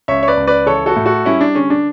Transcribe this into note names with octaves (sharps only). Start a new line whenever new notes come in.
C#2 C#5 E5
C#5
B4 D5
C#2
B4 D5
E3 A4 C#5
F#4 A4
A2
F#4 A4
G3 C#4 E4
D4
D3 C#4
D4